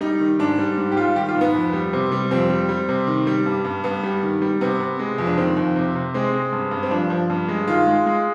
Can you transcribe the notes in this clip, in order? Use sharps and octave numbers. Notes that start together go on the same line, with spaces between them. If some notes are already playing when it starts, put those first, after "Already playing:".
G3 D#4
D#3
G#2 D4
G3
G#2
G4
G3 F4
D#3 G4
F4
G#2
B3
F2
G3
C3
G3
F2 C4
G3
G3
C3
D#3
G3
G2
G2
G2 B3
G3
D#3
G3
C3 B3
C3
G#3
F2
D4
D#3 C4
F2
C3
C3
G#3 C4
G#3
G2
G2
C4
F3 D4
F3
G2
G#3
D#3 F4
G#3
G#3